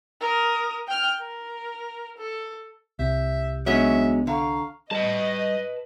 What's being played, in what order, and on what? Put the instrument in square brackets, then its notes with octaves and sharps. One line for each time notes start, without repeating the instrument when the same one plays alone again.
[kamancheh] A#4 D#6
G5 F6
A#4
A4
[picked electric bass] C2 [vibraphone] G4 [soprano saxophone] E5
[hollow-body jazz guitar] F#3 G#3 C#4 [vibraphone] B3 D4 [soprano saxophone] E5
[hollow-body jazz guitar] D3 [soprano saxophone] F5 [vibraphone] A#5 C#6
[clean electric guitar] G3 [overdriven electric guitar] B4 A5 [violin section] D#5